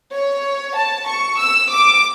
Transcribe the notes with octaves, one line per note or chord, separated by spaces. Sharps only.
C#5
A5
C#6
E6
D6